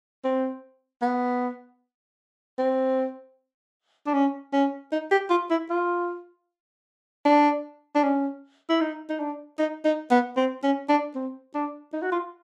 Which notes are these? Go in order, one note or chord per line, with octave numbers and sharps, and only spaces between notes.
C4
B3
C4
D4
C#4
C#4
D#4
G4
F4
E4
F4
D4
D4
C#4
E4
D#4
D#4
D4
D#4
D#4
B3
C4
C#4
D4
C4
D4
D#4
F#4
F4